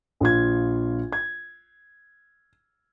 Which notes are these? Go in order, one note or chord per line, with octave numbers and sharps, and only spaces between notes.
A#1 F4 G#6
G#6